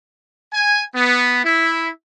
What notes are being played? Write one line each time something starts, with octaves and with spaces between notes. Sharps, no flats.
G#5
B3
E4